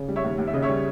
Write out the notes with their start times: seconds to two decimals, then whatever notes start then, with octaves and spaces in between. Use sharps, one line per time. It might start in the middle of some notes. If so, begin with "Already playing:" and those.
Already playing: C#3
0.08 G3
0.16 C#5 E5
0.24 D#2
0.38 D#2
0.47 E5
0.53 C#3 D#5
0.62 C#5 E5
0.69 G3